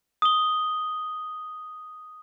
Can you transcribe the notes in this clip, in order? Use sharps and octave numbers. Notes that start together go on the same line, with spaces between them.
D#6 G7